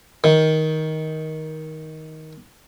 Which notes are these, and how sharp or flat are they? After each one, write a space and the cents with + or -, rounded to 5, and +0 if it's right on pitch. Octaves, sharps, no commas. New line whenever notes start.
D#3 +15